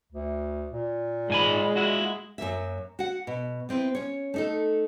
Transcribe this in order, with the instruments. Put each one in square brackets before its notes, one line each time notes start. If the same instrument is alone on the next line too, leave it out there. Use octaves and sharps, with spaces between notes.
[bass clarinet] D2
A#2
[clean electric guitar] G#2 G#5 B5 [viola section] G#3
[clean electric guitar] E4 F#4
[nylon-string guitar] F#2 F#3 A#3 E5
F#4 F#5
B2
B3 C4 E4 B4
C#4 C#5
A3 D#4 A4